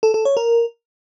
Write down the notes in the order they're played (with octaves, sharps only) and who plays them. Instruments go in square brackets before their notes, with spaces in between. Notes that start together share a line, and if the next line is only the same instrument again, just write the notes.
[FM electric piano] A4
A4
C#5
A#4